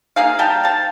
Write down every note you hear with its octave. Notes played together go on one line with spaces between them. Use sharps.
A#3 D#4 G#4 F5
G3 G5 A5 A#5
F5 A5